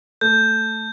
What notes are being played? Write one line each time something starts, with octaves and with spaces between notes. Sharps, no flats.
A3 G6